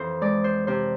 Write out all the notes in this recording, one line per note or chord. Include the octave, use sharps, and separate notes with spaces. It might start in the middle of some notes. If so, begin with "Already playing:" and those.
Already playing: F2 E3 A4 C5
G#3 D5
C5
C3 C5